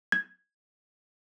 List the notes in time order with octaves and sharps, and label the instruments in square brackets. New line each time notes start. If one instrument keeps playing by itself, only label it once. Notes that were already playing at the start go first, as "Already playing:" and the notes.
[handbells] G#6